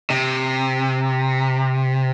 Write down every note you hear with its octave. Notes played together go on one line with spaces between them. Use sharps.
C3